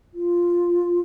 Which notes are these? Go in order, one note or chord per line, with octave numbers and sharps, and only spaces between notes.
F4